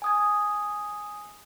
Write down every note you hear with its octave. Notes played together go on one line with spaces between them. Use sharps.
G#5 D#6 G#6